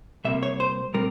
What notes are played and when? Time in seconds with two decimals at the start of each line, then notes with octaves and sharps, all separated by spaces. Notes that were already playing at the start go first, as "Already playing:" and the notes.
0.25 C2 C3 G3 A#3 E5
0.43 C#5
0.60 C5
0.94 A#2 G3 C4 A#4